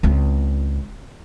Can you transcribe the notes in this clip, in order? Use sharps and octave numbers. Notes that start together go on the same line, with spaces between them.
C#2 C4